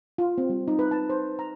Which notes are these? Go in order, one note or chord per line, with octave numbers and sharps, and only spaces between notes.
F4
C4
G3
D#4
B4
A5
C5
A#5